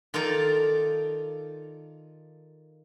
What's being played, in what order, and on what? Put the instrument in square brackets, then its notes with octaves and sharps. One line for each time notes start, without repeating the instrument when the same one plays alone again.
[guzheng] D#3 F4 A4 D5 A#5